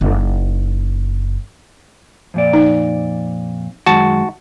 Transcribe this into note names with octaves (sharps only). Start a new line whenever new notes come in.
F#1 D#4
F2 A#2 D5
D#4
F#2 D#3 G#3 F#4 A5